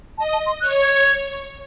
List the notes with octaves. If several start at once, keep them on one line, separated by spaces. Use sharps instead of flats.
D#5 A5
A5
C6
C#5 F#6
G#6